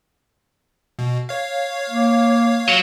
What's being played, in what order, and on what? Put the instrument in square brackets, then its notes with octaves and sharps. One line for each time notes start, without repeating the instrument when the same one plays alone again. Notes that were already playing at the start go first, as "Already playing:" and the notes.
[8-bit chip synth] B2
C#5 F5
[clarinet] A#3
[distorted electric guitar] F#3